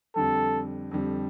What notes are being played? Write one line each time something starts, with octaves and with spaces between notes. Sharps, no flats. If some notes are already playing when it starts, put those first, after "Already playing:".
F2 D3 G3 A4
F2 D3 G3